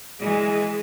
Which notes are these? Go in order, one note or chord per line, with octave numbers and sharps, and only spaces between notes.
E3 G#3 G#4